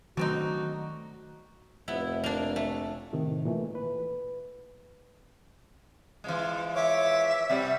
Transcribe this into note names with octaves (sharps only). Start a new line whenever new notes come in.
D3 D#3 F#3 A3 C4 D#4 F#4
F1 B3 E4
A#3 D4
A3
A2 C3 D#3
A#2 E3 A3
B4
E3 F3 G#3
C#5 E5 D6
C3 G3 F#5